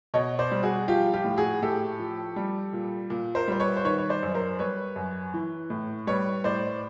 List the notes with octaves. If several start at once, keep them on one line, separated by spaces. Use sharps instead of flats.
B2 C#5 D#5
C5 D5
G3
F#4 G#4
F3 F4 G4
F4 G4
A2
F#4 G#4
A2 G4 A4
F3
G3
A#2
A#2
A#4 C5
G3 C5
B4 C#5
C5
D#3 B4 C#5
C#5
C5 D5
F#2
A#4 C5
G3 B4 C#5
F#2
E3
A2
G3 B4 C#5
A2 C5 D5